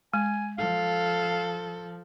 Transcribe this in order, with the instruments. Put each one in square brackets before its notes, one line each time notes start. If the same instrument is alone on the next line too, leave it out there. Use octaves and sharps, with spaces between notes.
[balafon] G#3 [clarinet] G#5
[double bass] F3 [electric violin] A4 [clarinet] F5